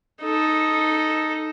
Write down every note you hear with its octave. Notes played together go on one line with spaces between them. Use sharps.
D#4 A4